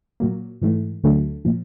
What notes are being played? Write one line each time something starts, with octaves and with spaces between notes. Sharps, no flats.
A#2 F#3 A#3
G#2 E3 A3
D2 D3 F#3 A3
A#2 F3